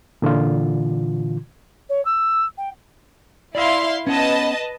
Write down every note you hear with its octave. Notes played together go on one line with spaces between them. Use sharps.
A#2 D3 E3 F4
C#5
E6
G5
E4 D5 E5 F5 C6
B3 C#4 B4 D#5 A5